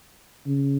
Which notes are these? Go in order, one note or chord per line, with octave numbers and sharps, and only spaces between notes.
C#3